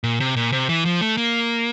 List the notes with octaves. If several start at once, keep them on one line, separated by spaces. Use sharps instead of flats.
A#2
C3
A#2
C3
E3
F3
A3
A#3